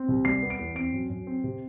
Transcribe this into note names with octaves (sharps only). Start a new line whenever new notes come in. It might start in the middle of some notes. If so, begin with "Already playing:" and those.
Already playing: C4
C2
G3 C7
B3
D7
E2
C4 D7
F#2
F#2
C4
C3